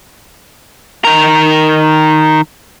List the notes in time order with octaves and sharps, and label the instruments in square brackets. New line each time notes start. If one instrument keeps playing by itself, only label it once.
[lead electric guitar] D#3 A#4